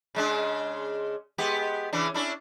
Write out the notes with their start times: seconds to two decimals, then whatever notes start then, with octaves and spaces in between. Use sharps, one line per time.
0.15 C#3 G#3 D4
1.38 G#3 B3 G4
1.93 C#3 E3 D4
2.14 C#4 D4 E4